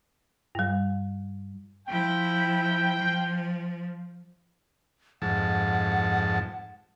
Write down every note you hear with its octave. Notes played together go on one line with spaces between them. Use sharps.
G2 G3
F3 E4 G5
F3
F2 G#2 F#5 A5